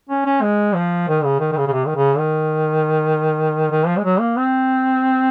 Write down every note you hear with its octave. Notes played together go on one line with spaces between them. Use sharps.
C#4
C#4
G#3
F3
D#3
C#3
D#3
D#3
C#3
C#3
C3
D#3
C#3
D#3
D#3
F3
G#3
F#3
A#3
C4